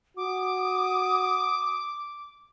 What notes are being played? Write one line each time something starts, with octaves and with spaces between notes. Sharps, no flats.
F#4 G#5 D6 D#6